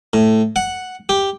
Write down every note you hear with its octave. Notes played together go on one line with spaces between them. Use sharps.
A2
F#5
G4